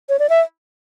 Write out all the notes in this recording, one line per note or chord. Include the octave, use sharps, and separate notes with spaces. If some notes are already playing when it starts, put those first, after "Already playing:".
C#5
D5
E5